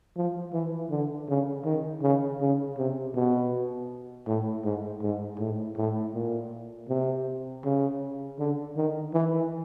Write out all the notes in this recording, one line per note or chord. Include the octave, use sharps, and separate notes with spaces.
F3
E3
D3
C#3
D#3
C#3
C#3
C3
B2
A2
G#2
G#2
A2
A2
A#2
C3
C#3
D3
D#3
E3